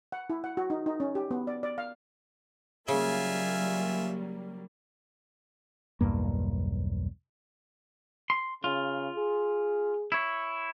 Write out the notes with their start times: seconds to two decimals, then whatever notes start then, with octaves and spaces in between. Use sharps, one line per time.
0.12 F#5
0.30 E4
0.44 F#5
0.57 F#4
0.70 D#4
0.86 D#4
1.00 C#4
1.15 G4
1.31 B3
1.47 D5
1.63 D5
1.78 F5
2.88 C#3 F#3 G3 A#3 F4 E5 G#5
6.01 B1 E2 G2 A#3
8.30 C6
8.64 C#3 F4
9.16 G#4
10.12 E4 C#5